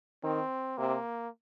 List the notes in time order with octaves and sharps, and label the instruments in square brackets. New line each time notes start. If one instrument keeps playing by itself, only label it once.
[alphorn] D#3 [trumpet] C4
[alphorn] C3 [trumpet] A#3